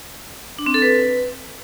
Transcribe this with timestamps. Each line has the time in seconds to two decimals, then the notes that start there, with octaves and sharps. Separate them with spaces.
0.59 D4
0.66 C4
0.74 A4
0.82 B4